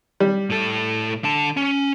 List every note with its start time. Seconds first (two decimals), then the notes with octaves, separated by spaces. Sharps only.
0.20 G3
0.50 A2 A4
1.24 D3 A5
1.57 C#4